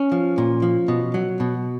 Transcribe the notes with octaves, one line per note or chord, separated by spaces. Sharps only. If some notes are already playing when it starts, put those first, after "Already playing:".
Already playing: C#4
F3
A#2
F3
B2
F#3
B2